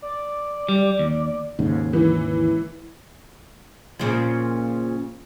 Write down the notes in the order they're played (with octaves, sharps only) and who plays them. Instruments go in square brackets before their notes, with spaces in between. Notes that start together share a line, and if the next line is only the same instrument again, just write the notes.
[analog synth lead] D5
[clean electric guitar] G3
D#2
[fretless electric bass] D#2 G#2 C#3
[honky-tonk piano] E3
[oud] A#2 C#3 F3